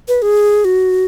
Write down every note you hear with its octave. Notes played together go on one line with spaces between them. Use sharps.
B4
G#4
F#4